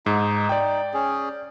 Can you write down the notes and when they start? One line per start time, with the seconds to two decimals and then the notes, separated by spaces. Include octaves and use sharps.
0.06 G#2 D#4
0.49 D5 G5
0.94 C#4 G#4